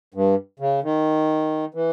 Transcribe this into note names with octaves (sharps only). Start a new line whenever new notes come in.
G2
C#3
D#3
E3